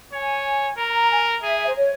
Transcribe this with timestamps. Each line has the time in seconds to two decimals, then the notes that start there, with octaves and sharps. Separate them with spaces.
0.13 C#5 G#5
0.77 A#4 A#5
0.94 A#5
1.10 G#5
1.42 G#4 E5
1.68 C5
1.76 C#5